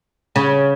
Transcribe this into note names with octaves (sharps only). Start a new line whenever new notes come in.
C#3